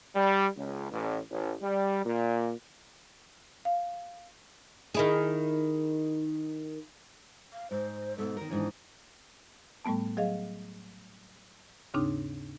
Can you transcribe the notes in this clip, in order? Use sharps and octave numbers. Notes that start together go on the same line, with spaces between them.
G3
C#2
A1
A1
G3
A#2
F5
D#3 E4 G#4
F5
G#2 C5
G#2 B2 A4
D#3 A#4
G#2 D#3 E3 D4
A2 G3 A3 B3 A5
F#3 G#4 D#5 F5
D#2 G#2 C#3 C4 D4 D#4